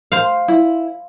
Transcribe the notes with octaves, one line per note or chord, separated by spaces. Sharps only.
C5 F5
E4